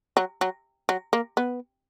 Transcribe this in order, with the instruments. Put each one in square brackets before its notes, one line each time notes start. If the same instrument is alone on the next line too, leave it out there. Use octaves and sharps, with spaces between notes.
[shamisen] F#3
F#3
F#3
A#3
B3